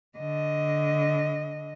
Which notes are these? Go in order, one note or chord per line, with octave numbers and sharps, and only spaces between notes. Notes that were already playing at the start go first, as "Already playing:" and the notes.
D3 D#5